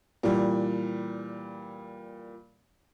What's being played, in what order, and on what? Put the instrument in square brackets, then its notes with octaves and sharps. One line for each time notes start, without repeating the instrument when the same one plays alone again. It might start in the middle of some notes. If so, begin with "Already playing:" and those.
[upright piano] A#2 E3 G3